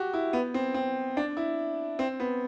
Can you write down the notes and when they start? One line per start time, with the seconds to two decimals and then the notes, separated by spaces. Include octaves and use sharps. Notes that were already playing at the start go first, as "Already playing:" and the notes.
Already playing: F#4 G4
0.13 E4
0.33 B3
0.54 C4
0.74 C4
1.17 D4
1.37 E4
1.99 C4
2.20 B3